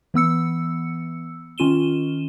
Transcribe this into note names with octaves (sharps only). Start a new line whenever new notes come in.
E3 B3 E6 C#7
D#3 C#4 F4 D#7 E7 G7